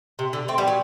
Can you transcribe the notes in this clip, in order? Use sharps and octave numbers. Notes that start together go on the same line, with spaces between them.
C3
D3
A3 C4
G3 B3
F#3